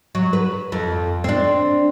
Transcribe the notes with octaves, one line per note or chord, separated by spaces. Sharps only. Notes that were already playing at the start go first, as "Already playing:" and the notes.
F#3
B4
F2
C4 D4